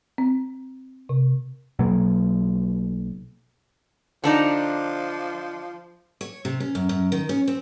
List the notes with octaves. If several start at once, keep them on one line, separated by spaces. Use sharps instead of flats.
C4
C3
B1 B2 F#3 A#3
D3 F3 D4 D#4
C#5
C3
C#4
F#2
F#2
D#3
C#4
C4